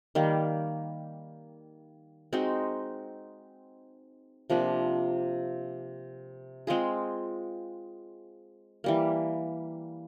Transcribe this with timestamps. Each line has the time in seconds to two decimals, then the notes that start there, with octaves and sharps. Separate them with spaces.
0.15 D#3 G3 A#3
2.33 G#3 C4 D#4 F#4
4.50 C3 F3 A#3 D4
6.67 G#3 C4 F4 G#4
8.84 E3 G3 A#3